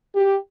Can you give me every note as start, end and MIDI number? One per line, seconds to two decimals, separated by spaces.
0.16 0.36 67